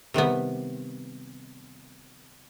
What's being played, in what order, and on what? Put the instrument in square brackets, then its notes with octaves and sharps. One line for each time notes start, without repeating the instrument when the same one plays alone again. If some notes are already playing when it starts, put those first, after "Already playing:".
[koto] C3 D#3 G3 B3